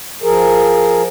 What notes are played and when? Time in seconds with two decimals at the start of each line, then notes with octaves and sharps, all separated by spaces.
0.23 F3 G#4 A#4